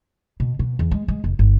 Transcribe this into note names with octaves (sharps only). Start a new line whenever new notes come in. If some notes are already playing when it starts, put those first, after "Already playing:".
B2
B2
E2
G#3
G#3
F1
G1